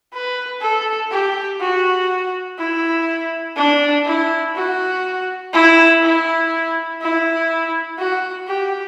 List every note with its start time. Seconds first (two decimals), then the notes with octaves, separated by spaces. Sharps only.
0.13 B4
0.61 A4
1.11 G4
1.60 F#4
2.58 E4
3.57 D4
4.06 E4
4.55 F#4
5.53 E4
6.02 E4
7.01 E4
7.98 F#4
8.48 G4